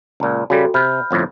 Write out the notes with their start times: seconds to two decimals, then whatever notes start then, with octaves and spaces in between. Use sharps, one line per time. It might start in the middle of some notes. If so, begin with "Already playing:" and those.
0.20 C#2 A#2
0.50 C#3 G3 F#4 A4
0.74 C3 B5 F6 G6
1.11 G1 F2 A2